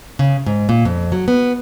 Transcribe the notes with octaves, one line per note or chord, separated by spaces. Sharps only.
C#3
G#2
A#2
F2
F#3
B3